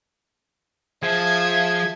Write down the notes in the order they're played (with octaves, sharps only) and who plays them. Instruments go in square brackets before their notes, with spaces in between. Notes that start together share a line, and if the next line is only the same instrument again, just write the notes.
[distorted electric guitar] F3 [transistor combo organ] G#4 [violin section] E5 A5 G#6